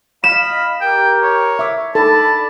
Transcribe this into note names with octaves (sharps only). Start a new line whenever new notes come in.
D#5 F5 B5 E7
G4 A#4 G5
C#5
E5 D6
D#4 A4 D5 A5 B5